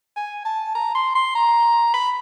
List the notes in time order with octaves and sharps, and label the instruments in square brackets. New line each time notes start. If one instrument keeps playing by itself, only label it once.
[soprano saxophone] G#5
A5
A#5
C6
C6
A#5
B5